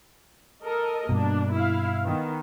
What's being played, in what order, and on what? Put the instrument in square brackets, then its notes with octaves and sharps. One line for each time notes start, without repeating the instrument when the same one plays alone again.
[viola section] A4 A#4 D#5
[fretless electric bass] G2 B2 [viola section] A#3 D4
[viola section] E4 F5
D#3 B3